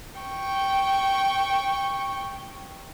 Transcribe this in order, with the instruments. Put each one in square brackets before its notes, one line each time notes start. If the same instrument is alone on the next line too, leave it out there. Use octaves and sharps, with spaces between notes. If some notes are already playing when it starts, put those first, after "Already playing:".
[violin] G5 C#6